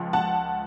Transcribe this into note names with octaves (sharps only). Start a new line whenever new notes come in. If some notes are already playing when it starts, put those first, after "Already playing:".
Already playing: C#2 F3
F#5 A5